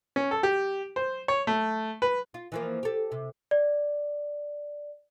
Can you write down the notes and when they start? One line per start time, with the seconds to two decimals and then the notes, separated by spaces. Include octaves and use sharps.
0.16 C#4
0.31 A4
0.43 G4
0.96 C5
1.28 C#5
1.47 A3
2.02 B4
2.34 F4
2.52 E3 F3 A#3
2.83 G4 A4
3.12 C3
3.51 D5